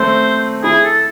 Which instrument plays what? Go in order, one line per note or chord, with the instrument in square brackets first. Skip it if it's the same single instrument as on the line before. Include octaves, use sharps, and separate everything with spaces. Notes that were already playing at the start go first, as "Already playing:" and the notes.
Already playing: [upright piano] A3 C4 [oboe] C5
[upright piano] E4 [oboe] G#4
[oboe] A4